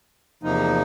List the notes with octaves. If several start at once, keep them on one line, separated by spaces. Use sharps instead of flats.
E2 C3 F3 A#3 D#4